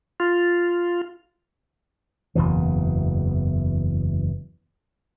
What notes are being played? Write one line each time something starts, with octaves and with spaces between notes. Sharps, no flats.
F4
F#1 E2 B2 E3